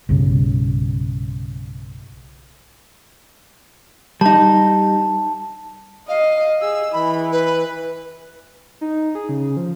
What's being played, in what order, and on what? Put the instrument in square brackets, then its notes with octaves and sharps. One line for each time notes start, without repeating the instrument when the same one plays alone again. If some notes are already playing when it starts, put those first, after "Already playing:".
[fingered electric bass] B1 G2 C#3
[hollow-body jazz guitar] G3 D#4 [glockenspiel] A5
[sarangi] D#5 [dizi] F5
[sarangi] G#4 [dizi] E6
[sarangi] E3 [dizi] B5
[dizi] B4
[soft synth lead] D#4
G#4
C#3
F3